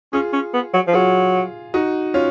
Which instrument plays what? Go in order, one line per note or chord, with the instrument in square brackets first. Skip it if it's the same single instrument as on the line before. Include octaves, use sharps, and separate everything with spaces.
[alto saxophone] C#4 [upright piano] F4 G#4
[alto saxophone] C#4
B3
F#3
F3
[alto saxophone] F#3 [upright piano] F4 G#4
[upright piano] D#4 F#4
C#4 F4